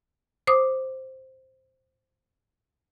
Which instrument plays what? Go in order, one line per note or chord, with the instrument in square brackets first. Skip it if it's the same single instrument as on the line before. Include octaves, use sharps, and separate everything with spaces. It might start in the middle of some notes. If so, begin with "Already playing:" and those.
[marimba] C5 D6 D#6